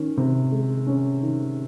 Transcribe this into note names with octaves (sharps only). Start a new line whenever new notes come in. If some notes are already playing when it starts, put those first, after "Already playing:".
Already playing: D#3 C#4
C3
G#3
C#4
D#3